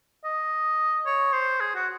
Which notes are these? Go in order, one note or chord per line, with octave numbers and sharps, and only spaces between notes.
D#5
C#5
C5
G#4
F#4